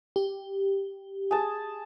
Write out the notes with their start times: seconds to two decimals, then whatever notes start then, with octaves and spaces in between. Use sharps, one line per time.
0.16 G4
1.31 G#4 A5